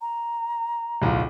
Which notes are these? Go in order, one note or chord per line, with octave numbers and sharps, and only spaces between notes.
A#5
D1 B1 F4